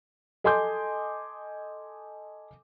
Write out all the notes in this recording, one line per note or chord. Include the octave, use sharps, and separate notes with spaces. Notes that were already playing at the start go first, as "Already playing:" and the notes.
A4 D#5 G#5 C6 D6 G6